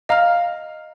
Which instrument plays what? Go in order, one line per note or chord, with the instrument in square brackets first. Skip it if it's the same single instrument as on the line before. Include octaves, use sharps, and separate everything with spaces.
[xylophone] D#5 A#5 F6 [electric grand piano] F5